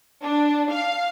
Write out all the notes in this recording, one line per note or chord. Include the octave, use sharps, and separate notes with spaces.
D4
F5